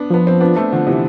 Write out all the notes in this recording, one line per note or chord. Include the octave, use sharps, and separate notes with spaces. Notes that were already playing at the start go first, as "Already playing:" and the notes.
Already playing: B3 D4
F3 B3
C4
B3 D4
A3 C4
D3 F3
C3 E3